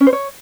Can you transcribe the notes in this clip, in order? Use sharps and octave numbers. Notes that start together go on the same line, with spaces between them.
C#4
C5
C#5